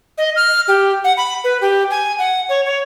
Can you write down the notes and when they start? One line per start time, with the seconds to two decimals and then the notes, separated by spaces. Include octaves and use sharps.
0.18 D#5
0.36 F6
0.68 G4
1.04 F#5
1.17 B5
1.44 B4
1.61 G4
1.91 G#5
2.19 F#5
2.49 C#5
2.66 C#5